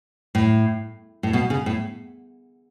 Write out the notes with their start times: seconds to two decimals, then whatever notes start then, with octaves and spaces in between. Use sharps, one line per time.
0.35 A2
1.23 A2
1.33 B2
1.50 C#3
1.66 A2